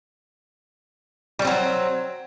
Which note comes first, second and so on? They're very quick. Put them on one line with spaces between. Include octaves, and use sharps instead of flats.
G3 C#4 C4 F#3